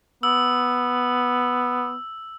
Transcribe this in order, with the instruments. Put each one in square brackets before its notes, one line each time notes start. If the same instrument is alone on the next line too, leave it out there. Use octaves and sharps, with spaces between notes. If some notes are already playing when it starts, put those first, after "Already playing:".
[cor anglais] B3 [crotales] E6